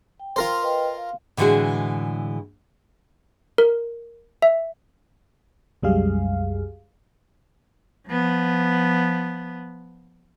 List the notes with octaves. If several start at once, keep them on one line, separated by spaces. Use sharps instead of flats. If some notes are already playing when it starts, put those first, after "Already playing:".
G5
F4 A#4 C5
B4 D#5 G5
F5
A2 D3 E3 G#3 F#4 G#4
A#4
E5
C2 F#2 G3 G#3 G#4 F5
F3 B3